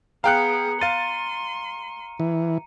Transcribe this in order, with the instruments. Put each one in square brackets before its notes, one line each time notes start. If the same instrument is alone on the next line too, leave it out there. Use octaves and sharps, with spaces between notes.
[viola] B3 G#4 [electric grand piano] F5 G5 F#6 [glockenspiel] A#5 C#7
[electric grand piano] F5 A6 [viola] C6 [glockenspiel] D#7
[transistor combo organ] E3